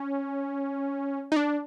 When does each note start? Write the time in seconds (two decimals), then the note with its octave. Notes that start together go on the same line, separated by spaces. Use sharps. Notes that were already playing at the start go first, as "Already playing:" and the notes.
Already playing: C#4
1.32 D#4
1.36 D4